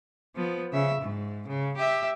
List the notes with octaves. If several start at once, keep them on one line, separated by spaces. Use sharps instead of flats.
F3 B3
C#3 E5
G#2
C#3
G4 E5